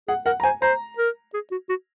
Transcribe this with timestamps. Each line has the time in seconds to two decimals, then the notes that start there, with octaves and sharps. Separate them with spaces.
0.08 G#4 F#5
0.26 A#4 F#5
0.40 A#5
0.43 C5 G#5
0.62 C5 A#5
0.98 A#4
1.34 G#4
1.51 F#4
1.69 F#4